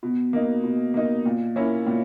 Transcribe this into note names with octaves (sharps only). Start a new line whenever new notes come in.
B2
A#3 D#4
B2
A#3 D#4
A#2
A#3 C#4 E4
A#2